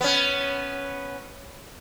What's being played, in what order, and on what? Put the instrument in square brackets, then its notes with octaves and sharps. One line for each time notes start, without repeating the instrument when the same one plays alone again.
[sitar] B3 C#4